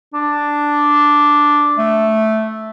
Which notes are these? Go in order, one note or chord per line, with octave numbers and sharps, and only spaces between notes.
D4
A3